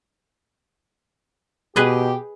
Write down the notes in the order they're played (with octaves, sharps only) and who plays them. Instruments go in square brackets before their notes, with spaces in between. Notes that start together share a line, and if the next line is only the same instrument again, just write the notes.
[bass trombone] B2 [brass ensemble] G4 [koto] G#4 B4 D#5